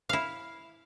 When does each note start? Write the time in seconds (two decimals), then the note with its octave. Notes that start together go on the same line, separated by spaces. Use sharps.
0.09 E4 F5